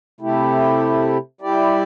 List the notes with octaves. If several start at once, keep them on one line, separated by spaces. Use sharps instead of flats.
C3 A3 E4 G4
G3 E4 G4 D5